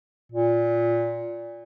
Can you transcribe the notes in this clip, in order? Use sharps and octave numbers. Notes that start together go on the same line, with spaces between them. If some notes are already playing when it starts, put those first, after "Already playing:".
A#2